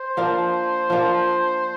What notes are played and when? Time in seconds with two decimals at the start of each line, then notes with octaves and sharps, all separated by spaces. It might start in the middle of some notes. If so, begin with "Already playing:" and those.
Already playing: C5
0.17 F3 A#3 D4
0.90 F3 A#3 D4